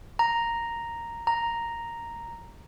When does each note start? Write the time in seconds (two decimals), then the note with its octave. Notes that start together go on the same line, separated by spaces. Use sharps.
0.19 A#5
1.27 A#5